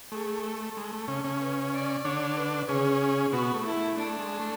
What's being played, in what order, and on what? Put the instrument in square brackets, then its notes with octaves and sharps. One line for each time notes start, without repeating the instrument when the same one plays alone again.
[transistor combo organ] A3 [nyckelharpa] G#4
[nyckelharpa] A4
[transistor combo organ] G#3
A3
C#3 C#4
C#3 C#4
[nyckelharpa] B4
D5
[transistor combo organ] D3 D4 [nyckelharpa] C#5
[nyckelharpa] B4
[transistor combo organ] C#3 C#4 [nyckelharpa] G#4
[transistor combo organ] B2 B3 [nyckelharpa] F#4
[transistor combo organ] A3
[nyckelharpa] E4
[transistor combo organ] A3
[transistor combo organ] A3 [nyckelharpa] D4
[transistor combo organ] G#3
A3